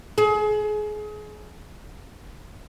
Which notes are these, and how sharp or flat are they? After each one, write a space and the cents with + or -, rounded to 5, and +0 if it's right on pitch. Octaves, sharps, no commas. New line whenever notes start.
G#4 +30